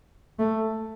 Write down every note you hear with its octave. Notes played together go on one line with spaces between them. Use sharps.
A3